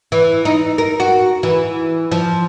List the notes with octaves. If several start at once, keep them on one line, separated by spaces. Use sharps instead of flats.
E3
D#4
A#4
F#4
E3
F3